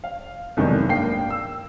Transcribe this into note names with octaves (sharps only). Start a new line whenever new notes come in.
F5
C2 F2 B2 D#3 F#3 G#3
G2 A#3 G5 C7
E6